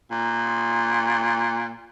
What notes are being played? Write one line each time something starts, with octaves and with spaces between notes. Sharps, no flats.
A#2